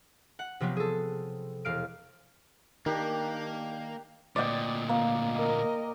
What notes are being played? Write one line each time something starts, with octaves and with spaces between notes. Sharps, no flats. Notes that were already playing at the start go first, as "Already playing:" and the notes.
F#5
C3 F3 F#3 B3 C4
G#4 A4
E1 F5 F6 D7
D#3 A#3 D4 G4 A#4
D2 A#2 D5 D#5 G5
A#3
A#4 D#5